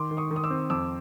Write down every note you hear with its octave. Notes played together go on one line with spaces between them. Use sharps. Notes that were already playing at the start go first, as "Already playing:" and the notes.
Already playing: D#3 C6 D6
D#3
C#6 D#6
D#3
D#6
D6 E6
C4
F2 D6 E6